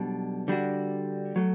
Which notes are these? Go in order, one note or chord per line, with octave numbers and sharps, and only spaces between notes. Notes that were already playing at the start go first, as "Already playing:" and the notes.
Already playing: B1 B2 G3 D4
D3 G3 D4 F#4
F#3 A3